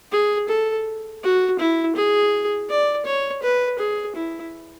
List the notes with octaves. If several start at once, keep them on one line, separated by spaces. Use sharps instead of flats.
G#4
A4
F#4
E4
G#4
D5
C#5
B4
G#4
E4